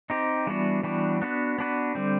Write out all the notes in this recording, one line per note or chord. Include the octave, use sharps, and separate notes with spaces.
C4 D#4 G4
E3 G3 B3 D4 F#4
E3 G3 B3 D4 F#4
B3 D4 F#4 B4
B3 D4 F#4 B4
D3 G3 C4